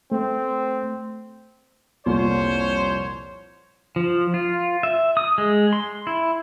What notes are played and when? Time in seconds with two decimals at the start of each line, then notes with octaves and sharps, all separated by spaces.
0.12 A3 C4
2.06 C2 F2 A#2 C5 C#5
3.96 F3
4.34 F4
4.83 E5
5.17 D#6
5.38 G#3
5.73 C6
6.07 E4